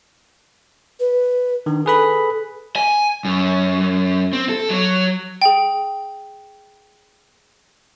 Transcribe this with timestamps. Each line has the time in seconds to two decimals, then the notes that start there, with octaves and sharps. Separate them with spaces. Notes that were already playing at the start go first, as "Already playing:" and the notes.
1.00 B4
1.66 D#3 D4
1.86 G#4 A4 B4 B5
2.76 G#5
3.25 F#2
4.33 C4
4.49 A4
4.70 F#3
5.42 G#4 G5